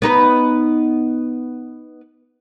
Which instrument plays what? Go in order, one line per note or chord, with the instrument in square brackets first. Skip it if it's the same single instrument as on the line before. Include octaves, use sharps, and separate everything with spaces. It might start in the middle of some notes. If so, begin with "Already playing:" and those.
[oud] B3 D#4 B4